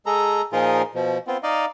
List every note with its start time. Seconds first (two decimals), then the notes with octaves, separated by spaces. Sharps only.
0.06 G#3 G#4 A4 A#5
0.53 A#2 F3 D#4 F4 G#4 A#4
0.95 B2 F3
1.27 B3 C4 F4
1.43 D#4 D5 D#5 F5